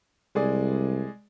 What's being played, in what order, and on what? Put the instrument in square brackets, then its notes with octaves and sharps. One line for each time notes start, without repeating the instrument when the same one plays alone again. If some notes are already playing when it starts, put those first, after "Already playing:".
[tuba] C2 [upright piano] G#3 G#4 D5